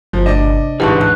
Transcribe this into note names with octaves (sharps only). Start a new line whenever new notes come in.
G1 F3
C3 A3 D4 D5 D#5
A1 D2 G#2 E3 G4 B4 A5 C#6
A5 F#6